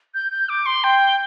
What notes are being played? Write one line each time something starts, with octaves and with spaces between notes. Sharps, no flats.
G6
G6
D6
C6
G5